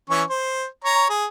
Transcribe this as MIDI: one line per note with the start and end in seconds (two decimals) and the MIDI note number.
0.10 0.23 52
0.10 0.23 61
0.10 0.23 85
0.30 0.66 72
0.84 1.06 73
0.84 1.06 82
1.10 1.26 68